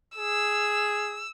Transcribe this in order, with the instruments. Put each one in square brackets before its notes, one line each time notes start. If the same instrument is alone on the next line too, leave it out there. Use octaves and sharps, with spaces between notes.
[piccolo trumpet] G#4 [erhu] E6